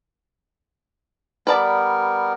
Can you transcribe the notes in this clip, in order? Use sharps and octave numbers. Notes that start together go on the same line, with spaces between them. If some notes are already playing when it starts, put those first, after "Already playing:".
G3 B3 A#4 B4 D5 A5